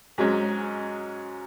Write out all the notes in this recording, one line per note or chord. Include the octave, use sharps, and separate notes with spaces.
G#2 F#3 G#3 C#4